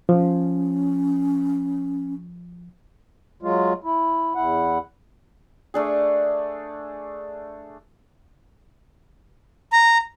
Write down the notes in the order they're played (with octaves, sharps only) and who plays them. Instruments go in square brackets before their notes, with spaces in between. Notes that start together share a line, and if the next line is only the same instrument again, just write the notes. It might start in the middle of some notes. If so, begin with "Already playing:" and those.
[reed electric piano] F3 [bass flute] C#4
[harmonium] F#3 G#3 F4
E4
E2 E4 F#5
[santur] A3 D4 G#4
[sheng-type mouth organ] A#5